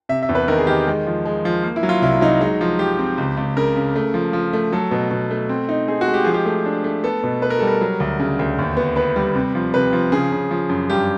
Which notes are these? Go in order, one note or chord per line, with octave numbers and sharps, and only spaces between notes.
C3 E5
E5
E2
B4
D#3 A#4
G#4
D#3 G4
G#3
F3
G#3
F3
A#3
E4
F#3
F4
C2 E4
F#3 D#4
G#3 D#4
F3
F3 G4
C4
C#2
C#2
C#3 A#4
C#3
A3
F3
F3
A3
F#3 A4
B2
B2
A3
C4
D#4
C4 G#4
F#4
G#3
G4
F3 G#4
G4
A3
D4
A3
B3 A4
B2
B3 B4
A#4
G3 A4
A#4
F#3
D2
C#3
D2
D#2
B3
B3 B4
G3
C3
F3
C3 B4
F3
C#3 G#4
C#3
F3
F#2
G2 G4